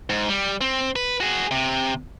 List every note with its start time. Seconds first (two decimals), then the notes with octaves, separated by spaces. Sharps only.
0.10 G#2
0.29 G3
0.61 C4
0.96 B4
1.20 F#4 G#4
1.51 C3